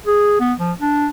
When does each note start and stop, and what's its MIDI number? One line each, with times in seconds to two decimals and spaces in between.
0.06 0.40 68
0.40 0.53 59
0.58 0.72 53
0.80 1.08 62